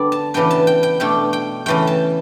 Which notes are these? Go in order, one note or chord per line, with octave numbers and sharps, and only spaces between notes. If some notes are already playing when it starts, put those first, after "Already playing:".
Already playing: D3 G3 B3 D5
A5
C#3 E3 B3 D4 G5
A5
G5
G5
B2 A3 D4 G5
G5
C#3 E3 A3 G5
A5